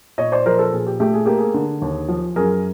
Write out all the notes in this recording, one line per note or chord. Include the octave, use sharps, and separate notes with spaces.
A#2 C#5 D#5
C5 D5
F3 A#4 C5
A4 B4
A#2 G#4
G4
A3 G4
G#4
A#3 G4
G#4
D3
D#2
F3
F#2 G#4 A#4